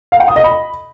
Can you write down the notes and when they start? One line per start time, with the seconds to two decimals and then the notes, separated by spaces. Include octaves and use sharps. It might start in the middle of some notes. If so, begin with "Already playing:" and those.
0.12 F5
0.20 G5
0.28 D#6
0.36 D#5
0.44 B5